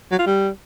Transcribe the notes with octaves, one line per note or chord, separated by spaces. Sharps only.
F#3
F4
G3